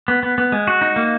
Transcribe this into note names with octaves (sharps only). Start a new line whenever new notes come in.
B3
B3
B3
G#3
F#4
D#4
A#3